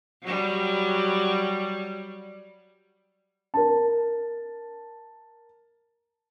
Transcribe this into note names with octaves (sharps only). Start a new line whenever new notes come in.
F#3 G3
A#4 A5